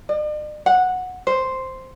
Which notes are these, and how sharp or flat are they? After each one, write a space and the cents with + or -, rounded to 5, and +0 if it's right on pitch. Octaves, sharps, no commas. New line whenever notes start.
D5 +45
F#5 -10
C5 +0